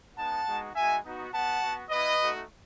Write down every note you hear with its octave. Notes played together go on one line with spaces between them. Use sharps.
G#3 B3 D#4 F#5 A5
G#3 B3 D#4 F#4
G#3 D#4 F#4 E5 G#5
B3 D#4 F#4
B3 F#4 F#5 A5
B3 F#4
B3 E4 B4 D#5
A3 D#4 F#4